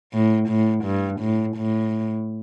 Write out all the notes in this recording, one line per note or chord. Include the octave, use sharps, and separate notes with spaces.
A2
A2
G2
A2
A2